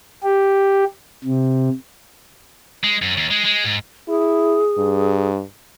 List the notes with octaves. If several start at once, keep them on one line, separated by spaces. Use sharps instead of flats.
G4
C3
G#3
F#2
D#2
G#3
G#3
G#2
E4 G#4
G2